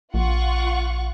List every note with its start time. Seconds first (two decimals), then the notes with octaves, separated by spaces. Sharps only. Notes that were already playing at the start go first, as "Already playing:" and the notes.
0.14 A#1 F4 F#5 C#6